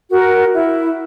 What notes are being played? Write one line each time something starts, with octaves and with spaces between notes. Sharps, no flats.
F#4 A#4
E4